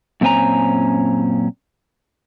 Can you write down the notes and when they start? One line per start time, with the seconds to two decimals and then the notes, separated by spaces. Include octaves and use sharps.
0.21 F#2 A#2 C4 C#4 G#5 A#5